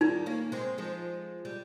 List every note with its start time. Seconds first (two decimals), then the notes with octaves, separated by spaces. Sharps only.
0.01 D#3 G3 D#4
0.26 A#3 C#4
0.52 G#3 C4
0.78 F3 G#3
1.45 G3